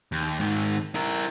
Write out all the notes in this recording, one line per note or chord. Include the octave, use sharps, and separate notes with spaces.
D#2
G#2 D#3
E4 A#4